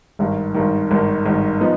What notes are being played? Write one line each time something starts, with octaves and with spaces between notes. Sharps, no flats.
G#1 G2 D#3
G#1 G2 D#3
G#1 G2 D#3
G#1 G2 D#3
F3 B3 D#4